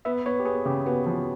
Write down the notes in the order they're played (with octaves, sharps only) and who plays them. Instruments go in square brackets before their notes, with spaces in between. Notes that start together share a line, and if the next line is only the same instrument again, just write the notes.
[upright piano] B3 [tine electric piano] E5
[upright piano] B3 [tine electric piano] C#5
[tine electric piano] G4
[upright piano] B3 [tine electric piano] G#4
[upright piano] C#3 [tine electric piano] G4
[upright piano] B3 [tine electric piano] F#4
[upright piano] F3 [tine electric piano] F#4